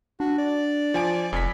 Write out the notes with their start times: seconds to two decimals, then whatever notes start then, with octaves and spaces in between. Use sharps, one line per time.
0.20 D4 F#4
0.38 D5
0.94 F3 G#5 D7
1.33 F1 F2 G#5 B6